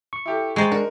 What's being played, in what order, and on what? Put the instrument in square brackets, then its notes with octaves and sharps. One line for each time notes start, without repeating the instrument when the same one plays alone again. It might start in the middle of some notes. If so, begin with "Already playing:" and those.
[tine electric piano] C#6
[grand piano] E4 G4 A4
[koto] G#3 C5 [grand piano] G5 C#6 [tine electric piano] G#5 A#5 A6
[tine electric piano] D4 [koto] F#4 [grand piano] A#4